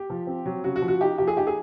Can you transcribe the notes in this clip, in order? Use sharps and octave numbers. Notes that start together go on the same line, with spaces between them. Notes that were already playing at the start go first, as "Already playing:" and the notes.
Already playing: G4
F3
C4
F#3
C#3 F#4
F#4
F3
F#4
D#4 G4
F3 G4
G#4
D#4 G4
G#4